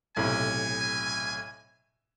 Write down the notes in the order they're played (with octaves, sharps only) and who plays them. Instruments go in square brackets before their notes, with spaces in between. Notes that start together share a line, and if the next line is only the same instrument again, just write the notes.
[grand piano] B1 A2 C3 [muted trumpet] G#5